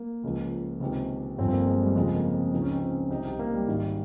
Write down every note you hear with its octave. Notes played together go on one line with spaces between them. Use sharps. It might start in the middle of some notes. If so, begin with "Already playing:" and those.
Already playing: A#3
C#2 C#3 F3
C#2 C3 D#3
G1 G2 F3 C4
C4
A#3
G#3
G3
F1 F2 C#3 F3 G#3
A#3
C4
C#2 C#3 F3 D#4
C#4
C4
C#4
C2 C3 D#3 D#4
G4
A#3
G3
G#1 G#2 D#3